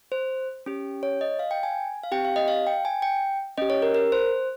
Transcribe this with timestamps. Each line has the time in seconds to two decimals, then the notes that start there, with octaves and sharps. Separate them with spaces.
0.12 C5
0.66 C#4 G4
1.03 C#5
1.21 D#5
1.39 F5
1.51 G5
1.63 G#5
2.03 F5
2.12 C4 G4 G5
2.25 F5
2.36 D#5
2.48 F5
2.67 G5
2.85 G#5
3.02 G5
3.58 C#4 G4 D#5
3.70 C#5
3.82 A#4
3.94 A#4
4.12 C5